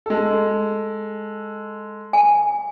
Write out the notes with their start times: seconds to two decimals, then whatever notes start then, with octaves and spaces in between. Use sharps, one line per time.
0.06 G#3 A4
2.13 G#5